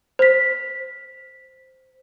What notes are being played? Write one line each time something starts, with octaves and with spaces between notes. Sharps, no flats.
C5 B6